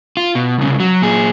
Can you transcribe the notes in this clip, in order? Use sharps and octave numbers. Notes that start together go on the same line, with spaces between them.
F4
B2
C2 C#3
F#3
A#2 G#4